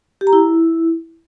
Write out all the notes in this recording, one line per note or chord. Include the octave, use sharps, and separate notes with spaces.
G4
A#5
E4